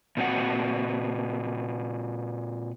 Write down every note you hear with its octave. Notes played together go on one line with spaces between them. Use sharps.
A#2 C4 F#4 F#5